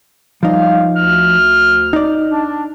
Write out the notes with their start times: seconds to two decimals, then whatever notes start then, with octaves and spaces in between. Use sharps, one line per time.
0.43 F3 G3 D#4 F5
0.96 D2 F6
1.93 D#4 D5
2.31 D4